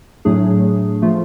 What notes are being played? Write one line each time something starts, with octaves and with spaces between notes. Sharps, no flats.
A2 F#3 A3 D4 G#4
F3 A3 F4